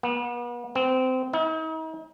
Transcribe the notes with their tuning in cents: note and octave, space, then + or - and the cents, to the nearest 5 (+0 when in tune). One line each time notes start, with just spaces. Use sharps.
B3 -40
C4 -25
D#4 +45